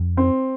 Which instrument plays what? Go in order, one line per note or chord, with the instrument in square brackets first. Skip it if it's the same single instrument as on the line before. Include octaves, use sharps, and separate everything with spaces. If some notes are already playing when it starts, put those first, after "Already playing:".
Already playing: [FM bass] F2
[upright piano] C4